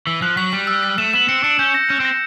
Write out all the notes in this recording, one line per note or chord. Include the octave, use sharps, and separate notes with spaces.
E3 B6
F3 F#6
F#3 B6
G3 B6
E6
B6
A3 E7
B3 E7
C4 C#7
D4 C#7
C#4 G6
A#6
C#4 G6
C4
A#6